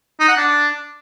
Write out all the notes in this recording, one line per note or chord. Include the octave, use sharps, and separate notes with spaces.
D#4
F#5
D4